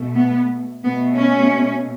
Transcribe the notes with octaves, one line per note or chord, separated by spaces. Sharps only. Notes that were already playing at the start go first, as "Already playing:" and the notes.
Already playing: B2 A3
B3
B2 A3 B3
C#4